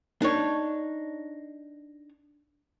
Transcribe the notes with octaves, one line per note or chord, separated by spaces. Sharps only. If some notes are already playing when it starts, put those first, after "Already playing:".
D4 D#4 C#5